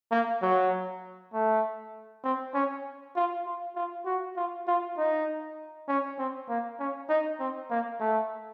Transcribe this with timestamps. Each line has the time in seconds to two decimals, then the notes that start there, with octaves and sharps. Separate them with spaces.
0.12 A#3
0.42 F#3
1.33 A3
2.24 C4
2.54 C#4
3.16 F4
3.46 F4
3.75 F4
4.05 F#4
4.36 F4
4.67 F4
4.98 D#4
5.88 C#4
6.18 C4
6.49 A#3
6.79 C#4
7.09 D#4
7.40 C4
7.70 A#3
8.01 A3